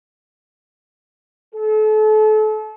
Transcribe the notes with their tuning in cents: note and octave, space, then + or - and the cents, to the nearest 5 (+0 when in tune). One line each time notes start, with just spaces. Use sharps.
A4 -35